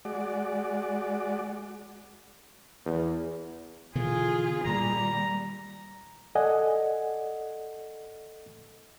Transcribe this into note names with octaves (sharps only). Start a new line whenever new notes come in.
G#3 F#4 D5
E2
B2 D3 E3 F4 G#4
A#2 D#3 G3 A#5
A4 D5 D#5 F#5 G#5